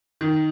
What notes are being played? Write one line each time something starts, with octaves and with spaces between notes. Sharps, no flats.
D#3